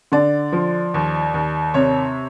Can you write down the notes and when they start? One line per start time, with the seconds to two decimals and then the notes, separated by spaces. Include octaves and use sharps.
0.12 D3 D5
0.52 F3
0.94 D#2
1.34 D#2
1.74 C3 C#5